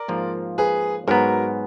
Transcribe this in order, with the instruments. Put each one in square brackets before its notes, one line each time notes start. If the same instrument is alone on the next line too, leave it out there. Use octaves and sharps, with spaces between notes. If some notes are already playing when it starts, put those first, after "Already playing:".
Already playing: [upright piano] A#4 D5
[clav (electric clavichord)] G#2 F3 A#3 F4
[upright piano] G#4 B4
[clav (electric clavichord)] G#2 F#3 B3 [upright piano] F#4 A#4